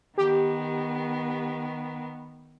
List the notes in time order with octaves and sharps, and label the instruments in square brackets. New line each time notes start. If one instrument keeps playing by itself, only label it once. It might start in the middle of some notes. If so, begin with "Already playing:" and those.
[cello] D#3 B3 [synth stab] G4